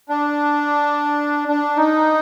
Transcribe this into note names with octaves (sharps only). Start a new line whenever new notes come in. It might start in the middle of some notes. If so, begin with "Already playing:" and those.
D4
D4
D#4